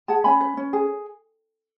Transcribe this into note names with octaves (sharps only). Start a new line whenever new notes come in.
G#4 F#5 A5
C#4 G#5 B5
B4
C#4
G#4